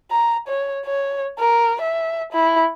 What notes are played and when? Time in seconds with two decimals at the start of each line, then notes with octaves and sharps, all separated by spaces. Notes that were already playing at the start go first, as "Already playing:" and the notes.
0.11 A#5
0.48 C#5
0.86 C#5
1.39 A#4
1.81 E5
2.33 E4